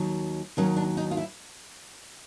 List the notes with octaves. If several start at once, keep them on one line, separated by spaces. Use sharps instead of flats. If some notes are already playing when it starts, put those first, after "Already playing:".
Already playing: D#2 D#3 F#3
D#2 D#3 F#3 C#4
D4
D#4
F4
E4